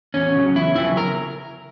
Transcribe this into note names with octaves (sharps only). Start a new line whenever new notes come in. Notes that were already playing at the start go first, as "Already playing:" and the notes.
E2 C#4
C#3 F#3
E2 E4
C#3 F#3 E4
A#4